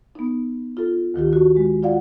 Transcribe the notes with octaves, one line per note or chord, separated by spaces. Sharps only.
B3 D#4
F4 A4
D2 D#3 F4 G4
F#4
G#3
F4 D5 F5 F#5